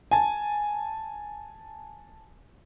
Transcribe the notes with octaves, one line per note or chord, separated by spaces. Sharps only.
G#5 A5